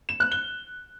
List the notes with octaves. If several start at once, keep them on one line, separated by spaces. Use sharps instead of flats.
E7
F#6
G7